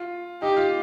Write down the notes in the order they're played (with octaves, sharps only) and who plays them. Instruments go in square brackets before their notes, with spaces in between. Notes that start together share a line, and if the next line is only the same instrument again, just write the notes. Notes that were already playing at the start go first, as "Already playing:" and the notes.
Already playing: [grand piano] F4
[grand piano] D#4 [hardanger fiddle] G4
[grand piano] F4